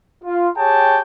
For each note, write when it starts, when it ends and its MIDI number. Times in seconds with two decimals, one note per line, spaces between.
0.24 0.48 65
0.57 1.00 67
0.57 1.00 68
0.57 1.00 73
0.57 1.00 79
0.57 1.00 81